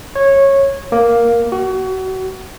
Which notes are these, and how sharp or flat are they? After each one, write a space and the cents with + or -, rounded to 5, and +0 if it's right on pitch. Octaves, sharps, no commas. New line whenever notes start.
C#5 -15
A#3 +5
F#4 +30